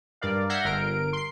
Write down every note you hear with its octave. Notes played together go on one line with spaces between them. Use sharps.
G2 A#4 D5 F5
E5 F#5 G6 G#6 A#6 C7
G1 A#4 D7
C6 C7